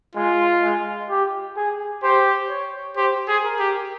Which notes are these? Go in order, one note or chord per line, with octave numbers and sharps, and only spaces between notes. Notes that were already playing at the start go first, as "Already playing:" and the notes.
G#3 F4
G#3
G4
G#4
G4 C5
C#5
G4 C5
G#4
A#4
G4